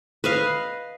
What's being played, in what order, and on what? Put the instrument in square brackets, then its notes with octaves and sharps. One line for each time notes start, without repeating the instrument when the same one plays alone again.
[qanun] B4 D#5 F5